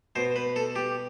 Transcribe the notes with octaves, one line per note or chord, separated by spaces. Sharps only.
B2 C5
B4
A4
G4